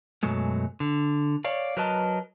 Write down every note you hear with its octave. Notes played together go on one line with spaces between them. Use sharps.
F#2 B2 F#3 G#3 A3
D3
C#5 D5 F5
F#3 A#4 B4 D#5 A5